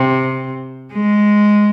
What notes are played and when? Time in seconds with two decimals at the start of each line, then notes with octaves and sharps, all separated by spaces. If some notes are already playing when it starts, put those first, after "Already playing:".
Already playing: C3
0.94 G#3